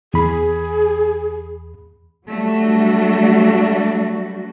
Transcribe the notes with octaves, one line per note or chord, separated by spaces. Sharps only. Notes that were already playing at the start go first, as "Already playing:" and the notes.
E2 G#4 B5
F#3 G3 A3 D4 F#4